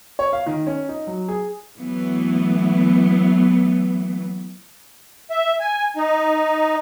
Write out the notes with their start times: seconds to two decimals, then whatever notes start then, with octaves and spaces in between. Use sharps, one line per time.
0.19 C#5
0.33 F5
0.46 D#3
0.67 C#4
0.89 D#4
1.07 F#3
1.29 G#4
1.79 E3 F#3 A3 B3
5.30 E5
5.60 G#5
5.97 D#4